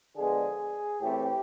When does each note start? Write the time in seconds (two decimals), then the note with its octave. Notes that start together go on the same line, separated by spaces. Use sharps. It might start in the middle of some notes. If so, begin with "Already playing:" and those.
0.16 D3 F3 G#3 B3 G#4
1.02 A2 E3 A3 C4 G4